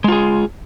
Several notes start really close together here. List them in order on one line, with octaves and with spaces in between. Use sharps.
G#3 F4 G#4